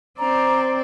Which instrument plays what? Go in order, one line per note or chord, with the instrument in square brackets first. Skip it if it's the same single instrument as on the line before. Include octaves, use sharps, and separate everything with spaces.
[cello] C4 D5 [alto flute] A#5